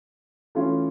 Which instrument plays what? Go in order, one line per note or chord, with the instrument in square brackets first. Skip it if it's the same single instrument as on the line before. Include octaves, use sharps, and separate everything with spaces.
[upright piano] E3 A3 C#4 F4